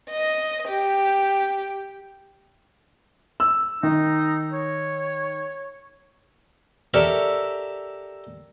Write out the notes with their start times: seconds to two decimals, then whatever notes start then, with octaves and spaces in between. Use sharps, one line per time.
0.11 D#5
0.68 G4
3.40 E6
3.83 D#3 D#4
4.53 C#5
6.94 G4 A4 A#4 C#5 D5 E5